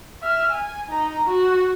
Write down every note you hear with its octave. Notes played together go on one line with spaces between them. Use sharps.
E5 F6
G#5
D#4 A#5
F#4